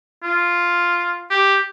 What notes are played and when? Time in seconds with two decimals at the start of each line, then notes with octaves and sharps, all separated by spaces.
0.23 F4
1.30 G4